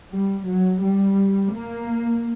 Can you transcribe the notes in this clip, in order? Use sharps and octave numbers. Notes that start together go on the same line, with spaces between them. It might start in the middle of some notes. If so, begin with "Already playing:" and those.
G3
F#3
G3
A#3